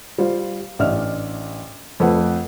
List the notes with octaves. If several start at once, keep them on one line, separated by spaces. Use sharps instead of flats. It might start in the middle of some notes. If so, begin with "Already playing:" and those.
G3 F4 C5
A1 D4 E5 F6
F2 A3 B4 F#5